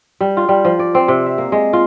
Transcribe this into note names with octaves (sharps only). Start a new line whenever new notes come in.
G3
F4
G3
F3
D5
C4
C3
E5
A#3
G#3
F4